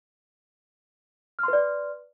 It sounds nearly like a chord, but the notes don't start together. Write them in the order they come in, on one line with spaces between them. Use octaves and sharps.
F6 C6 B4 D5